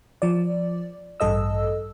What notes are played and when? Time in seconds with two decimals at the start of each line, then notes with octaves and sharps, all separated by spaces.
0.22 F3 D5
1.20 A1 G2 A4 D#5 E6